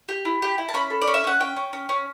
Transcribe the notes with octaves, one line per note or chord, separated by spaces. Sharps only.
G4
E4
G4
E4
A5
C#4 B5
A4
D5
C#4
E5
C#4 F#5
C#4 G5
C#4
C#4
C#4